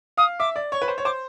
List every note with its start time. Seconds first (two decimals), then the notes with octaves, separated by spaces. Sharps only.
0.17 F5 D#6
0.39 E5 D6
0.56 D5
0.72 C#5 C#6
0.82 B4
0.88 C5
0.98 C#5
1.05 C5 D6